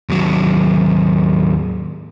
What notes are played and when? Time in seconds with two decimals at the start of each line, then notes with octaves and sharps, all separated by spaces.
0.09 D#2 F#3